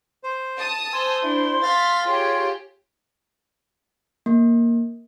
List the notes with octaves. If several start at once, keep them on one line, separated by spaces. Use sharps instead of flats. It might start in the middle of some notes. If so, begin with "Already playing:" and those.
C5
A5 D#6
C5 G#5 C6 E6
D4 E4
F5 F6 A6 B6
F4 G4 G#4 C#5
A#3